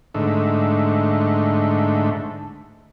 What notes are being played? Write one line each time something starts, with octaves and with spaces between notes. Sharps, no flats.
G#2 D3 A3